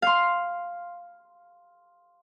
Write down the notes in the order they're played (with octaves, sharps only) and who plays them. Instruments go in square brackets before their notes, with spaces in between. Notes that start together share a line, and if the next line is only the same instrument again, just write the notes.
[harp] F5 C6